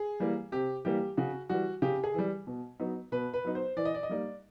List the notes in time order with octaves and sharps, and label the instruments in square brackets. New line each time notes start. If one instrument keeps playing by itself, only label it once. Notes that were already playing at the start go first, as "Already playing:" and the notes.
Already playing: [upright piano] G#4
E3 G3 A#3
C3 G4
E3 G3 A#3 G4
C#3 F#4
E3 G3 F#4
C#3 G4
G#4
E3 G3
B2
F#3 B3 D#4
B2 B4
B4
F#3 B3 D#4
C5
E3 D5
D#5
D5
D#5
G3 A#3 D#4 D5